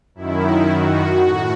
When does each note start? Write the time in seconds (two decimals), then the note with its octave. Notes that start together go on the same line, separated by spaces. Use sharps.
0.15 F#2 D#3 E4
0.69 F#4
1.24 A2